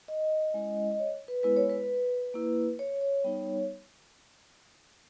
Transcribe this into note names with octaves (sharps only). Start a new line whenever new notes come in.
D#5
G#3 C#4 E4
D#5
C#5
B4
G#3 B3 E4 B4
C#5
B4
A#3 E4
C#5
C#5
G3 B3 D#4